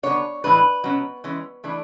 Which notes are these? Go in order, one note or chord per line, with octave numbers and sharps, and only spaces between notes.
D3 F#3 B3 D4 C#5
A2 E3 G#3 D4 B4
B2 F#3 C#4
E3 G#3 C#4
E3 A3 D4